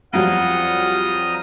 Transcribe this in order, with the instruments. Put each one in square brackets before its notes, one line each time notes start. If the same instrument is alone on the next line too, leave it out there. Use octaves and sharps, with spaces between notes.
[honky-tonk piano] F2 F#3 G3 [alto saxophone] F4 [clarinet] F#5 [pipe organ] A#5 D#6